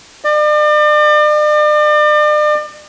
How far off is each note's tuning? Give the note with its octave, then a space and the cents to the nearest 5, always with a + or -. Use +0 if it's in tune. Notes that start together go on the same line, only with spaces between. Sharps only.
D5 +40